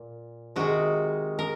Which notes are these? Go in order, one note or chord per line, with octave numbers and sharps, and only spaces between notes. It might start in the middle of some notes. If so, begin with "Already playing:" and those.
Already playing: A#2
C3 D#3 G#3 F#4
A#4